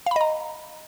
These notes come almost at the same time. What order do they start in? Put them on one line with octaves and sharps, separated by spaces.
F5 B5 D#5 A#5